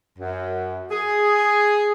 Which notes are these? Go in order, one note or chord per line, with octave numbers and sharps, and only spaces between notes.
F#2
G#4